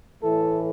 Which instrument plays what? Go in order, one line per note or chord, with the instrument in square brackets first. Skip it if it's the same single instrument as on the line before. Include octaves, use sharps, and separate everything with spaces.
[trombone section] A2 E3 A3 A4